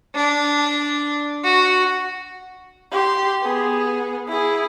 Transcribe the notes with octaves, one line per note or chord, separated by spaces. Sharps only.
D4
F#4
G4 C6
B3 G#4
E4 G#4